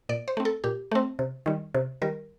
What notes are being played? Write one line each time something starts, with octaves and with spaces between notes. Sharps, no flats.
A#2 D5
C5
A3 C4
A4
A#2 G4
A3 C4
C3
D#3 G3
C3
D#3 G3 A#4